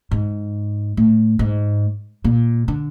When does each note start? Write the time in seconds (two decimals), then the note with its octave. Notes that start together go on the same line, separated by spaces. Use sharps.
0.11 G#2
0.97 A2
1.39 G#2
2.24 A#2
2.68 D3